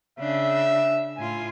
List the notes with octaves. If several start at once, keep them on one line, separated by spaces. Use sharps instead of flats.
C#3 D4 E5
A2 F4 G#5